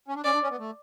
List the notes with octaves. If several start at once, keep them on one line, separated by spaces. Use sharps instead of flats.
C#4
D4
C#4 D5
D4
C#4
B3
A3